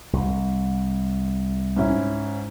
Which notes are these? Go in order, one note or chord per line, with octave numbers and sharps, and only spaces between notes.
C2
G#2 C#4 E4